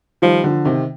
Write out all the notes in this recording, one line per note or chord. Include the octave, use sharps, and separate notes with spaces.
D#3 F3 G3
D3 F3
C3 D#3